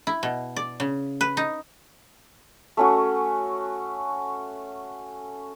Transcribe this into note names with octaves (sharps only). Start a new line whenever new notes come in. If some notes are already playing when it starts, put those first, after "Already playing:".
E4
B2
D5
C#3
B4
D#4
A3 C#4 F#4